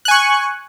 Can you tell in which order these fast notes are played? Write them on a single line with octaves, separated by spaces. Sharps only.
F#6 G#5 C#6